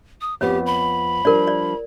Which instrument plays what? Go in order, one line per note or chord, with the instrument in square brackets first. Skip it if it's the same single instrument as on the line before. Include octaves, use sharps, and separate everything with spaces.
[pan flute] D#6
[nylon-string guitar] F2 B3 [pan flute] G4 [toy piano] C#5
[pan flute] B5
[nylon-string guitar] F3 G3 D4 [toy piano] A#4 D5
[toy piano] D5